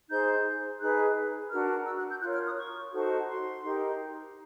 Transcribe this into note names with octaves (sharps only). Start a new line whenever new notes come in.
D#4 G#4 C5 G6
D#4 G#4 B4 F#6
D4 F#4 A#4 F6
E6
F#6
G6
F4 A#4 C#5 F#6
F6
D#6
C#6
D#4 F#4 A4 C5
C6
D#4 G4 A#4